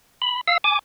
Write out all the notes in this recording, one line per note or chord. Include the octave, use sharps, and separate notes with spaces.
B5
F5 E6
G#5 D6